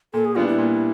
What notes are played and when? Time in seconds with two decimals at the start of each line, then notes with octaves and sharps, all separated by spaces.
0.13 A#2 A4
0.25 G#4
0.35 G3 B3 D4 F4
0.47 E4
0.58 A#2